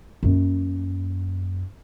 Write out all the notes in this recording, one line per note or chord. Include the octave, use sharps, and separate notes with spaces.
F#2 A#3